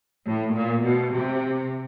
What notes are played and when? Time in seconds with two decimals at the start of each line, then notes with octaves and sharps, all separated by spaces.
0.29 A2
0.57 A#2
0.85 B2
1.14 C3